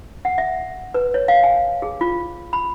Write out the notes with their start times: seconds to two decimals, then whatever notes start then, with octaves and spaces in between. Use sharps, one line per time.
0.25 F#5
0.38 E5
0.94 B4
1.14 C#5
1.28 F5
1.44 G#5
1.82 G#4
2.01 F4
2.53 B5